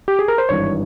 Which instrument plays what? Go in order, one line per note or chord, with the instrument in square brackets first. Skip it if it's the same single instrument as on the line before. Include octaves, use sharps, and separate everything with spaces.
[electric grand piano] G4
G#4
A#4
C5
G#1 G2 E3 C#5